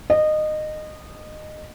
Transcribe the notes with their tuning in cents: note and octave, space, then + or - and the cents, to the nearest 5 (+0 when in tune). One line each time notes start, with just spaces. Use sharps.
D#5 -20